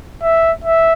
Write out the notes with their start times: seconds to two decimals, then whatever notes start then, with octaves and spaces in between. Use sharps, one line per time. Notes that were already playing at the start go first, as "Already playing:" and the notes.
0.23 E5
0.64 E5